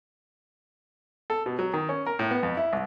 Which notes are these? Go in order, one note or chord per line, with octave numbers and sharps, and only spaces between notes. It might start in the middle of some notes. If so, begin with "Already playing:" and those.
A4
B2
F#3
D#3
C#4
A#4
A2
B3
F2
E4
C2